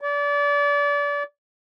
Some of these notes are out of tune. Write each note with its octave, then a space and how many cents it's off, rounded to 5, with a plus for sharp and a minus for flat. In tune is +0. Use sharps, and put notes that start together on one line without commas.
D5 -30